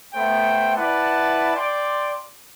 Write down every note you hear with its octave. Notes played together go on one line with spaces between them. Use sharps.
A3 B3 C5 G5
E4 B4 D5 F#5 A5
D5 G5 C6 D6